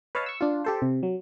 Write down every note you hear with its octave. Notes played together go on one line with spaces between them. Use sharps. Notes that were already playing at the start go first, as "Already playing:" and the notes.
B4 C#5 D#5 F5 A5
C#6 E6
D4 F4
G4 A4 C5
C3
F#3